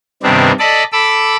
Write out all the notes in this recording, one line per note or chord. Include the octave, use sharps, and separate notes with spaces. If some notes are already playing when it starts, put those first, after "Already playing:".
G2 C3 D#3 B3 C4 D4
A4 D5 D#5 A5 B5
A4 B5 D6 E6